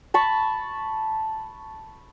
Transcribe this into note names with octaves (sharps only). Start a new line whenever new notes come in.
A5 B5 C#6